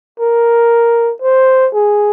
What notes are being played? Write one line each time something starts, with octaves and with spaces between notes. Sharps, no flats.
A#4
C5
G#4